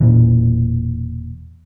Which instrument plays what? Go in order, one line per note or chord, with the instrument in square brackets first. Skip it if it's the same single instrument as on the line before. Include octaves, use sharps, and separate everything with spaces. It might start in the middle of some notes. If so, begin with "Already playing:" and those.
[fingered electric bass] E1 A#2 E3